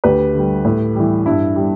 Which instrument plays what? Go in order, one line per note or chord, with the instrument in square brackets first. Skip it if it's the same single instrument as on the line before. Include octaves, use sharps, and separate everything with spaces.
[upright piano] D2 G4 B4
D3 G3
A2
E3 G3
G2 E4
G3